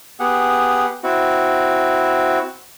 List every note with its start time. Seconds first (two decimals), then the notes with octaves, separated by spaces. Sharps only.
0.20 B3 G4 G#4 F#5
1.04 C4 E4 F#4